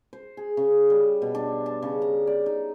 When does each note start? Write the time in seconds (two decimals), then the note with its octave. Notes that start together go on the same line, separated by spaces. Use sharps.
0.13 C5
0.37 G#4
0.57 C#3
0.90 G3
1.22 B2
1.35 D4
1.66 A5
1.83 C#3
2.02 A#5
2.27 D5
2.46 D#4